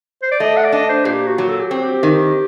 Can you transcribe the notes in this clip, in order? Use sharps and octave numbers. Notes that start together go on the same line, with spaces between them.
C5
D5
A3 D#5
F#5
D5
D4 D#5
C5
A#2 G4
F#4
F#3
A4
G4
C4 F#4
G4
D#3